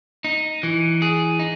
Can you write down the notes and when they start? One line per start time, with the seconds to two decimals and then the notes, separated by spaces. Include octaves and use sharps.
0.24 D#4
0.63 E3
1.02 G#4
1.39 D#4